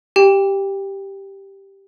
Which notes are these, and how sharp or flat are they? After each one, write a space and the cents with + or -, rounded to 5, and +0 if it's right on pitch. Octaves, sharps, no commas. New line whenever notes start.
G4 +0 G5 +25